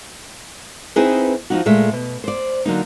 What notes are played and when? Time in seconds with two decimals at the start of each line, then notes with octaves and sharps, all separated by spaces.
0.96 C4 D#4 E4 G#4 B4 D#5
1.50 F3 D#4 F#4
1.66 A#2 G#3 A3 E5
1.92 B2
2.24 C5 D5
2.65 D3 F#3 A#3 D#4